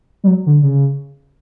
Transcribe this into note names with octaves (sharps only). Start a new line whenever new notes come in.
G3
F#3
D3
C#3